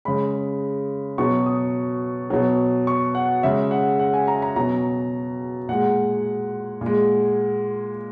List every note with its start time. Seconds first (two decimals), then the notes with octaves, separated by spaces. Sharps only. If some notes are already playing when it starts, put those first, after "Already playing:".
0.05 C#3 G#3 B5
1.18 B2 F#3 C#6
1.46 D#6
2.30 B2 F#3
2.87 C#6
3.15 F#5
3.43 C#3 G#3 E5
3.71 F#5
3.99 F#5
4.14 G#5
4.27 A#5
4.42 A#5
4.56 B2 F#3 A#5
5.69 A#2 G#3 F#5
6.81 A#2
6.86 G#3